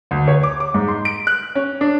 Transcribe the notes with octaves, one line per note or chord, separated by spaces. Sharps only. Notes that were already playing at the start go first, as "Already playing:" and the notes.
D2
C#5
D6
D6
G#2
C6
D7
F#6
C#4
D4